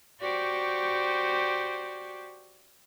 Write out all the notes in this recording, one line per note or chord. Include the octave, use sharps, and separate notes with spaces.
F#4 G4 C5 D5 C#6